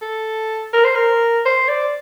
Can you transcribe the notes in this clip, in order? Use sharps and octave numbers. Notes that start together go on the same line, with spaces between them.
A4
A#4
C5
A#4
C5
D5